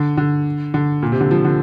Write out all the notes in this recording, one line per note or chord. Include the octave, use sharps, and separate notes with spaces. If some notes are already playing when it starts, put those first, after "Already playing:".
Already playing: D3
D3
D3
A#2
C3
D3
F3
D3